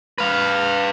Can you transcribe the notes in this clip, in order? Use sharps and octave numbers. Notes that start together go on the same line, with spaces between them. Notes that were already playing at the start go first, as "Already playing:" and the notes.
B4 F5